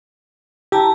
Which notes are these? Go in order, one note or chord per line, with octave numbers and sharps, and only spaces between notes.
E4 G4 A5 A#5